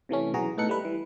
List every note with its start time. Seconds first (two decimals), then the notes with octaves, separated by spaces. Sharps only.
0.09 C3 E3 A3 C#4
0.34 B1 E3 F#4 G#4 A#5
0.57 A2 B3 D#4 A4 F#6 C#7
0.69 G3 A3 B4
0.83 E3 G3